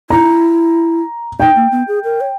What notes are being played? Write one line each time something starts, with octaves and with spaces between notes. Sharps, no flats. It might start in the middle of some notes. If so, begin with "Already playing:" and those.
E4 A#5
D#4 G5
A#3
B3
G#4
A#4
C#5